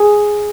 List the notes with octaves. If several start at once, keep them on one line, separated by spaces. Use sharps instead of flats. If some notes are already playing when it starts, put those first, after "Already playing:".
Already playing: G#4